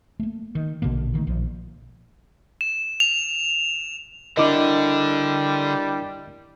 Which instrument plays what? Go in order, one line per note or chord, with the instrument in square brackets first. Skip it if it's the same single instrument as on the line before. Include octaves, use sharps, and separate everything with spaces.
[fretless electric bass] A3 A#3
D#3
A#1 B2 D3 A#3
D3 D#3 G3 A3
A#1 F3
[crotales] E7
F7
[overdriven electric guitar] D3 [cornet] G3 [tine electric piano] D4 E4 A#4 [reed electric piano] D#5 D6